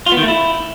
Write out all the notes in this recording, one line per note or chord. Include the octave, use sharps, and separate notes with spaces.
F4
B3
D#3
A3
E4